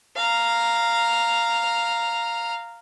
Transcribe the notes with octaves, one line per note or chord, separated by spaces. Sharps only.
F5 A#5